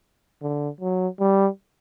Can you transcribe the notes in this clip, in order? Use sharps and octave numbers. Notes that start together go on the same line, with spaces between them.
D3
F#3
G3